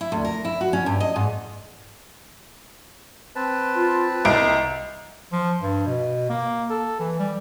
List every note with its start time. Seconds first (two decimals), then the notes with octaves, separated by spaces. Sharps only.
0.01 E4
0.12 D2
0.24 A#4
0.45 E4
0.61 F#4
0.73 C#4
0.86 G2
1.00 D#5
1.16 G#2
3.36 C4 B4 A5
3.76 F4
4.25 C2 D#5 D7
5.32 F3
5.62 G2
5.87 B2
6.29 A#3
6.70 A4
6.99 E3
7.19 G3